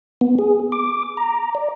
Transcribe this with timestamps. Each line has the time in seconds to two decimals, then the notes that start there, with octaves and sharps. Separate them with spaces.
0.21 B3
0.39 G#4
0.72 D6
1.17 A#5
1.55 D5